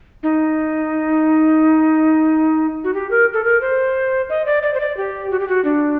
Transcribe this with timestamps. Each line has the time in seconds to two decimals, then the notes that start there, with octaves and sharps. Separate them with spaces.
0.23 D#4
2.84 F#4
2.94 G4
3.11 A#4
3.33 A4
3.44 A#4
3.61 C5
4.30 D#5
4.46 D5
4.63 D5
4.74 C5
4.80 D5
4.97 G4
5.31 F#4
5.40 G4
5.48 F#4
5.65 D4